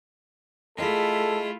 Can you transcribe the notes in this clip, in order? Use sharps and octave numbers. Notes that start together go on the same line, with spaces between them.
A3 E4 F4 G#4 A4 D#5